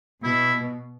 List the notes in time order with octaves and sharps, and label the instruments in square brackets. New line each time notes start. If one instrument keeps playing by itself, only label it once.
[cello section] B2 [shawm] E4